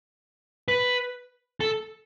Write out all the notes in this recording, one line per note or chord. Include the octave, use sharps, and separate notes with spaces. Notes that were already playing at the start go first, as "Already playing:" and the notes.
B4
A4